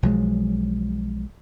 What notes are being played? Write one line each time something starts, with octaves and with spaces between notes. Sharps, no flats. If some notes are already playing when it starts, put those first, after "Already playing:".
B1 F3 F#3 G#3